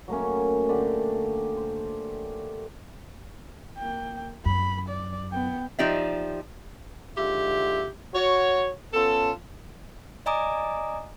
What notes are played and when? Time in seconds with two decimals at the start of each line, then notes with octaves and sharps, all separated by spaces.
0.08 F#3 A3 A#3 C#4
0.69 D3 G4 D5
1.57 C5
3.78 A#3 G5
4.46 F#2 B5
4.89 D5
5.31 B3 G5
5.79 F3 D#4 G4 D5 E5
7.17 G#2 D3 F4 G4 E5
8.14 F#4 C#5
8.94 B3 C#4 F4 A4
10.26 D5 D#5 G#5 A#5 D6 D#6